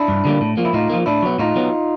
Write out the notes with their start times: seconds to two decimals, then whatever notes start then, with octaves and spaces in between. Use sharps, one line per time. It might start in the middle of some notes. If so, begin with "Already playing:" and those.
Already playing: D4 E4
0.08 G2
0.25 D3 G3 A#3
0.41 A2
0.57 F3 A#3
0.65 E4
0.73 A2 D#4 F4
0.90 F3 A#3
1.06 A2 D4 E4
1.22 F#3 B3
1.39 A2 D#4 F4
1.56 F#3 B3